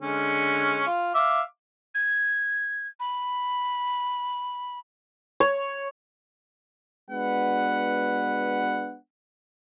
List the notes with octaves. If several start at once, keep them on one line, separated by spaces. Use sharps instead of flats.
D3 G#3 C#4
F4
E5 F5 D6
G#6
B5
C#5
G#3 B3 D4 F#4 B4 F#5